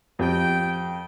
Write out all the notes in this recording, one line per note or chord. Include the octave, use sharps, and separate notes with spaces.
F2 G4 G5